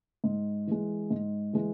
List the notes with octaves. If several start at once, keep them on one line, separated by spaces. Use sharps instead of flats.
G#2
E3 G#3
G#2
E3 G#3